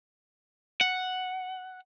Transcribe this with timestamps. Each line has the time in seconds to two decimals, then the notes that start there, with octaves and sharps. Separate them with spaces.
0.81 F#5